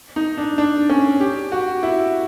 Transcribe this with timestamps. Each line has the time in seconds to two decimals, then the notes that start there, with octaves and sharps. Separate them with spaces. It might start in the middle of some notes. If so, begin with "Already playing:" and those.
0.16 D#4
0.38 D4
0.58 D4
0.90 C#4
1.20 G4
1.52 F#4
1.83 E4